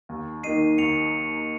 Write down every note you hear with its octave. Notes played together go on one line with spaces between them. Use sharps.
D#2
D#3 A#3 D#4 C7 D#7
D#2 C#7 F7